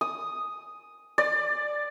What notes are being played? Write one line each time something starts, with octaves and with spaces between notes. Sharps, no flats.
D#6
D5